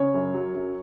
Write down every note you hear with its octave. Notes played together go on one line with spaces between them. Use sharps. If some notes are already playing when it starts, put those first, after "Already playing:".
Already playing: C#3 C#5
F#2
F#3
F#2